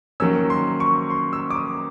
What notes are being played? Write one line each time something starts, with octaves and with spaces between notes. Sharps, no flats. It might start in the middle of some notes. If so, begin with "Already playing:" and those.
D#3 F#3 A#3 C#4 E6
C6
C#6
C6
E6
D6
D#6